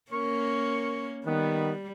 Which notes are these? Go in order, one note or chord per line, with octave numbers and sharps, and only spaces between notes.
A#3 C#4 A#4 C#6
D#3 G3 B3